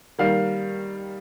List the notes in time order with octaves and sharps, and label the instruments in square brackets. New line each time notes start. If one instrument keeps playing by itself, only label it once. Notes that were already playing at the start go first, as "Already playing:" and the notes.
[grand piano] D#3 G3 A#3 F5